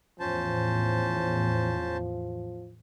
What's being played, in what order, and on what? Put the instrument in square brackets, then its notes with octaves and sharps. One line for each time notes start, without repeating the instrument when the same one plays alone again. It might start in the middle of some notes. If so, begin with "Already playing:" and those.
[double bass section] E2 A2 [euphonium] F3 [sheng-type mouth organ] C#4 C5 A5